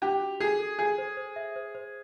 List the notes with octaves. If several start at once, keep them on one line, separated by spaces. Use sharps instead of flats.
D4 G4
F#4
G#4 A4
A4
G#4 G#5
C5
C5
E5
C5
C5